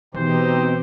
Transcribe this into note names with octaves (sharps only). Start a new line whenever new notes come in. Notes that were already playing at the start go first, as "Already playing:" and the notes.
B2 E3 C4 D#4 G4 C5